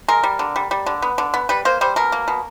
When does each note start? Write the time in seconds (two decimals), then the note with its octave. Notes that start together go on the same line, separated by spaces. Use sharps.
0.08 G#3 A#4
0.23 G3
0.39 D3
0.56 G3
0.71 G3
0.86 D3
1.02 B3
1.18 D3
1.34 B3
1.49 G3 B4
1.65 A#3 C5
1.81 G3 C5
1.96 B2 A#4
2.12 A#3
2.28 B2